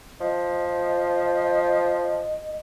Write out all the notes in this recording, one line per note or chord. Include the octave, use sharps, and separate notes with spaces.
F3 D#5